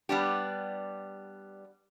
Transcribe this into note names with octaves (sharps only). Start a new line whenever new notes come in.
G3 B3 D4 G4